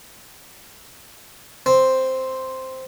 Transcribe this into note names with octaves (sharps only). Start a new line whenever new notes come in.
C4